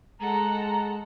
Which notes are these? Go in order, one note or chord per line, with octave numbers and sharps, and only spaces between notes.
G#3 A4 F#5 A#5